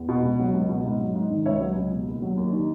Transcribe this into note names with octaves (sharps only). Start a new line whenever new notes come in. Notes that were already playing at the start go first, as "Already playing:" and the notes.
Already playing: E2
B2
C#2
F#3
C#2
B2
G#2
F#3
G#2
D#3
C#2 C#5 E5
F#3
C#2
B2
D#2
F#3
D#2
D#3